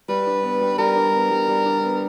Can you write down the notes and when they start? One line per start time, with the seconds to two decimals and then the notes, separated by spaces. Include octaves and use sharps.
0.08 G3 B4
0.27 D4
0.43 B3
0.61 G3
0.78 G3 A#4
0.96 D4
1.14 B3
1.31 G3
1.48 G3
1.65 D4
1.83 B3